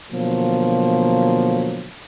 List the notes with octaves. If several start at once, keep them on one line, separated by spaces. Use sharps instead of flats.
B2 D3 F3 F#3 A#3